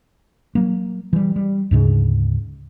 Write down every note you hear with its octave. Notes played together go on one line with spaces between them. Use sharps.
F#3 A#3
E3 G3
G3
D2 G#2 C#3